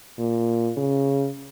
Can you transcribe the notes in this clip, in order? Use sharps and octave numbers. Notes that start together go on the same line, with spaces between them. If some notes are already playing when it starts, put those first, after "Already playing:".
A#2
C#3